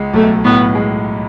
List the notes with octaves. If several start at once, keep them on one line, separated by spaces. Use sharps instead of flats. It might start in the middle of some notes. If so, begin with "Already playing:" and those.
Already playing: C#2 G#3
B1 A3
A2 B3
G#3